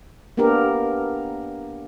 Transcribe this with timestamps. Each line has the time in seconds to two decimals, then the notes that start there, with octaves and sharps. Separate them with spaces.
0.37 A#3 B3 D4 G4 A#4